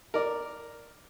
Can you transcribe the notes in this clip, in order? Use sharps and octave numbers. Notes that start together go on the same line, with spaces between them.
A#4 D5